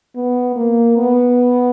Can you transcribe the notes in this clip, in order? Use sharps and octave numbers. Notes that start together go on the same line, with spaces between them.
B3
A#3
B3